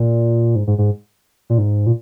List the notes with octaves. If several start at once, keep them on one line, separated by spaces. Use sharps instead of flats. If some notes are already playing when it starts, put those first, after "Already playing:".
Already playing: A#2
G#2
G#2
G#2
A#2
G#2
A#2